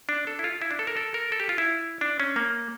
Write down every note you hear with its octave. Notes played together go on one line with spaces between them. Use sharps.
D4
A4
E4
F4
E4
D4
A4
A#4
A4
A#4
A4
G4
F4
E4
D4
C#4
A#3